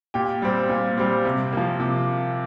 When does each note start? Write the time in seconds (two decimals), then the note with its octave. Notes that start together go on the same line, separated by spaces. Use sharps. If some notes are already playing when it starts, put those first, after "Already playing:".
0.14 A#2 G4
0.42 G3 C4
0.69 A#2
0.98 G3 C4
1.25 C3
1.53 F3 A#3
1.80 C3